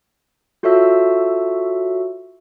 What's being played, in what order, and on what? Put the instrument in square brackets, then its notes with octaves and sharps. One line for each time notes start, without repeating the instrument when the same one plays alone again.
[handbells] F4 F#4 A4 C#5 E5 E6